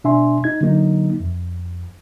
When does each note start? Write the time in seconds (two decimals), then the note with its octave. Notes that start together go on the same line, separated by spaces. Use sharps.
0.04 B2 D4 E5 G#5 C6
0.44 D#4 G#6
0.61 D3 F#3 A#3 D#4
1.20 F2